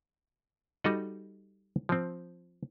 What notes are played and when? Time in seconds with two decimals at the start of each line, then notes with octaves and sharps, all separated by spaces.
0.84 G3 D#4 F#4 A4 D#5 F#5
1.89 F3 C4